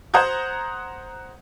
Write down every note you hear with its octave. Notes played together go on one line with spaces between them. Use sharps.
C5 F#5 A#5 D#6 G6 G#6